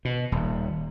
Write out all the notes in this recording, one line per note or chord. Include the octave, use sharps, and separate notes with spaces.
B2
D#1